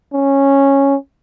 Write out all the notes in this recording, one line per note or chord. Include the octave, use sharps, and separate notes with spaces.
C#4